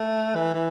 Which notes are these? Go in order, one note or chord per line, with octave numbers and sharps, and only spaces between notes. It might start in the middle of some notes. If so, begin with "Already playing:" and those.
Already playing: A3
E3
E3